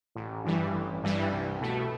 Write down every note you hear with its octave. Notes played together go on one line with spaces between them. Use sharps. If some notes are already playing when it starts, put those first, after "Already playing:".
A1
G2 E3 G3
A1
G2 E3 G3
C2
B2 A3